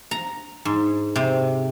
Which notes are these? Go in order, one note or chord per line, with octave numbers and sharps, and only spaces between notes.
A#5
G#2
C3